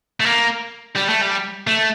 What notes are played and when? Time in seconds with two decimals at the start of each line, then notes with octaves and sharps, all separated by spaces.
0.20 A3
0.25 A#3
0.96 G3
1.09 A3
1.21 G3
1.67 A3